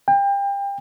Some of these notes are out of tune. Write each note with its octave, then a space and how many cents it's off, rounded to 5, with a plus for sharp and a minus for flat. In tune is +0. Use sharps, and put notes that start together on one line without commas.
G5 +30